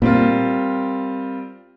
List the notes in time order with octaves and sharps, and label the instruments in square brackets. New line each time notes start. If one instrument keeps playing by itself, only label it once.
[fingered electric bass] A#2 [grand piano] G3 C4 F4 A#4